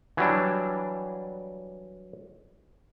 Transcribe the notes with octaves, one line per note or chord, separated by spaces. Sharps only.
E3 F#3 G3 D4